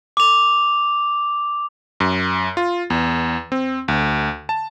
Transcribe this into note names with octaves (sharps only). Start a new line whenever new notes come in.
D6 F7
F#2
F4
E2
C4
D2
A5